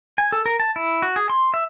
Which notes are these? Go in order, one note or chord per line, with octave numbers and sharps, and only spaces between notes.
G#5
A4
A#4
A5
E4
F#4
G#4
C6
E5